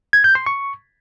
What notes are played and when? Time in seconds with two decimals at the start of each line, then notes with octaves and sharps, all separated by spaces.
0.13 G#6
0.24 G6
0.35 C6
0.46 C#6